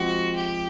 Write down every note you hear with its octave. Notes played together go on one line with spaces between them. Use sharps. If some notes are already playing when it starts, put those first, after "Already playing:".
Already playing: F3 G#3 C4 F#4
G4